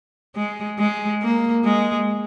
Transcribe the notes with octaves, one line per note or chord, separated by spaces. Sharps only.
G#3
G#3
A#3
G#3